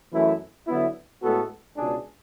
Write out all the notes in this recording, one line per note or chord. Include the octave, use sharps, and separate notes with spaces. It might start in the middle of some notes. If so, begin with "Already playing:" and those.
F#2 E3 A3 E4
D3 F#3 B3 E4
A2 G#3 B3 F#4 A4
C#2 B2 G#3 D4 G#4